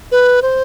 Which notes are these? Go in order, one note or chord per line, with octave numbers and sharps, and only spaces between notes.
B4
C5